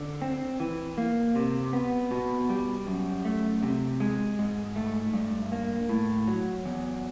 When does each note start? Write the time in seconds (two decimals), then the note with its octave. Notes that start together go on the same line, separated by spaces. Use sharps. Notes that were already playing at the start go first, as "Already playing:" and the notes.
Already playing: D3
0.22 C4
0.60 E3
0.98 A#3
1.35 C3
1.73 B3
2.11 B2
2.49 G3
2.87 F#2
3.25 A3
3.63 C3
4.00 G#3
4.39 G#2
4.76 A3
5.13 G2
5.52 A#3
5.89 A2
6.28 F#3
6.65 E2